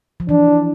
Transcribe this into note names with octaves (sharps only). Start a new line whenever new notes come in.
F3
E3 D4